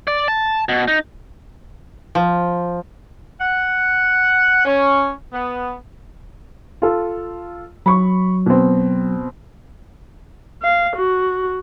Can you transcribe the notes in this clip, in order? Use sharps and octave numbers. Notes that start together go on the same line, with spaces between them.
D5
A5
B2
D#4
F3
F#5
C#4
B3
F4 A4
F#3 B5 C#6
B2 C4
F5
F#4